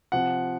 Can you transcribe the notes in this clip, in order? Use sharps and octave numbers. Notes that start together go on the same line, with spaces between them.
C3 F3 F#5